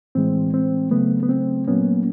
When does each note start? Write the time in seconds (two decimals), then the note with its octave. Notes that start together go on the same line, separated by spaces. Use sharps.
0.15 A2 E3 G#3 C4
0.54 C4
0.91 C#3 F#3 A3 B3
1.23 B3
1.29 C4
1.68 A#2 F#3 A#3 B3 C#4